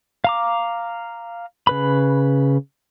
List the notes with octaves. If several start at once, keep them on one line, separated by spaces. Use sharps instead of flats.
F5 A#5 D6
C#3 B4 B5